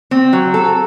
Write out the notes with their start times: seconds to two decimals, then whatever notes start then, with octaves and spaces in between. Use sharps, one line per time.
0.11 C4
0.33 F#3
0.54 A4